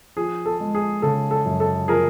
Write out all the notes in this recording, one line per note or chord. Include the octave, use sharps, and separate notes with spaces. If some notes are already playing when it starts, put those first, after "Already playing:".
F3 G#4
A4
G#3
G#4
C#3 A4
A4
F#2
A4
F3 G#4 A#4